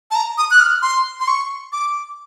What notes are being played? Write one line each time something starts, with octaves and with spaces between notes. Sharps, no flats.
A5
A#5
D#6
F#6
F6
C6
C6
C#6
D6